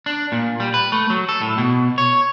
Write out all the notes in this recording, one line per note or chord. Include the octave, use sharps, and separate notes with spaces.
D4
A#2
G3
B4
A3
F#3
A4
A2
B2
C#5